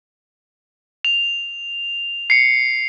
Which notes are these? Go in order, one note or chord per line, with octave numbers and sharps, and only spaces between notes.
F7
C7 C#7